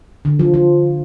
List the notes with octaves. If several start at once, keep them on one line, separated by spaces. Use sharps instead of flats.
D3
F3
F3